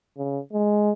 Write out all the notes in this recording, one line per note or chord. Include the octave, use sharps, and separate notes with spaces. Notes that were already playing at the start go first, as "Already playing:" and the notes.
C#3
G#3